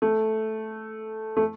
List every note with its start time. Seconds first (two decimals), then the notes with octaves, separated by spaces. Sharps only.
0.02 A3
1.37 A3